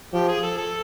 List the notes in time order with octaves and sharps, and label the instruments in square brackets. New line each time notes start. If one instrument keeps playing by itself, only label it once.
[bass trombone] F3 [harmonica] G4
[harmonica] G#4
A4
A4